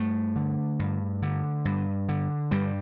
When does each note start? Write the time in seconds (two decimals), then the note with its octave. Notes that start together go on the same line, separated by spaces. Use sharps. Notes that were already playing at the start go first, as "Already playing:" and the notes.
Already playing: G2 A3
0.36 D3
0.79 G2
1.22 D3
1.65 G2
2.09 D3
2.51 G2 G3